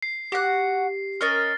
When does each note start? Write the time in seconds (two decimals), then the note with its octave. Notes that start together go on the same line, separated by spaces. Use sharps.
0.03 C7
0.32 F#4 G4 F#5
1.21 C#4 A#4 D#5 F6 A6 A#6